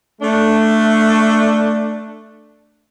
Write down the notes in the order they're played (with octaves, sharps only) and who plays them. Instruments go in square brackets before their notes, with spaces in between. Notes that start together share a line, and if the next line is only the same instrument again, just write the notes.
[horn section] A3 D4